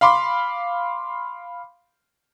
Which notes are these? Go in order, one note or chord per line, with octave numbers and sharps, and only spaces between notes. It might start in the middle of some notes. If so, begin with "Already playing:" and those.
F5 B5 C6 D6